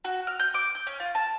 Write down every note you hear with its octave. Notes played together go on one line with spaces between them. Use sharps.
F#4
F6
G6
D6
G6
C#4
F4
A5